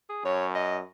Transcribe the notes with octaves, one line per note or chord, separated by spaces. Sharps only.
G#4
F#2 C#5
D#5